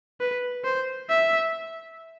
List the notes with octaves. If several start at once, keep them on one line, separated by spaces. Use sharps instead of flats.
B4
C5
E5